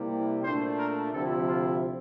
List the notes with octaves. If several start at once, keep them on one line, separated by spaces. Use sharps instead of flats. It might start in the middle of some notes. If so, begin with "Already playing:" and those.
Already playing: C3 G3 A#3 E4
A#2 A3 D4 C5
A#4
D2 C3 F3 C4 E4 A4
F4